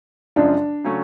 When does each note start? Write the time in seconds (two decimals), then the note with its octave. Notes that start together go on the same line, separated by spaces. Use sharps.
0.36 F#2 C#3 F3 G#3 D4
0.84 C#3 F#3 A3 C#4